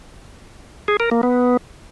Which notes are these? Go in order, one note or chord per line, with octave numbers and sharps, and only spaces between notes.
G#4
A#4
A#3
B3